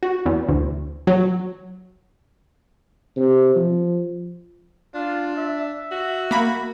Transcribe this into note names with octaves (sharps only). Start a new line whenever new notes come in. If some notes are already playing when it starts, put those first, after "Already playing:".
F#4
E2
D2
F#3
C3
F3
D4 F4
E5
F#4
A#3 B5